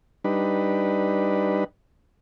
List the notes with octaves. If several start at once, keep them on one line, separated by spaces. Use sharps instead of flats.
G3 D4 D#4 B4